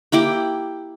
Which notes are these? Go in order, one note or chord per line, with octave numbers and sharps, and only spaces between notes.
A#3 E4 G4 G5